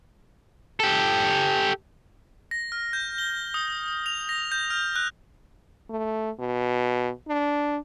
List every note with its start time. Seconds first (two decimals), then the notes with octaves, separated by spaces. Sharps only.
0.80 G4 A4
2.51 A#6
2.72 F6
2.93 G6
3.18 G7
3.54 D#6
4.06 F7
4.29 A#6
4.52 G6
4.70 F6
4.96 F#6
5.90 A3
6.39 B2
7.29 D4